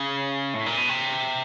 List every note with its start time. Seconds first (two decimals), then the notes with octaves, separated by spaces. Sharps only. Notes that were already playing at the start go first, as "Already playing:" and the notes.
Already playing: C#3
0.54 A2
0.66 A#2
0.77 B2
0.89 C3